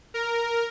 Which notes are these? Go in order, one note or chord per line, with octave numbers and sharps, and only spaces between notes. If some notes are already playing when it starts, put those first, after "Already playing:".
A#4